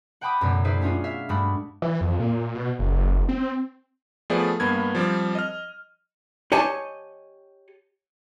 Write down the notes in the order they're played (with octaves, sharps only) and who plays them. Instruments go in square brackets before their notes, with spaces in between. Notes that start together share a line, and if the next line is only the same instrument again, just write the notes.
[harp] F#5 G5 A5 B5 D6 D#6
C#2 F#2 B2 A3 B3 D5
D#4 G#4 B4 C5 D5 E5
B3 C#4 D4 F4 F#4 G#4
E5 F5
G2 G#3 A3 D4 F#4 B5
[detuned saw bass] E3
F2
A#2
B2
F#1
C4
[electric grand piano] F3 A3 B3 G#4 D5
G2 A#3 B3 G#6
F3 G3 C4
D#5 F6
[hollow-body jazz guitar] G4 C#5 D#5 G#5 A5